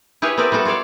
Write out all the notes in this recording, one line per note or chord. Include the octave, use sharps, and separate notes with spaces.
E4 G4 G#4 B4 C#5
B3 C4 A#4 B4 D5 E5
G3 B3 F#4 A4
F4 A4 C#5 D5 F5